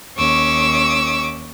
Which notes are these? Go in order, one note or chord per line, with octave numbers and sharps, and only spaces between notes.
D#2 C#4 C#6 D6 E6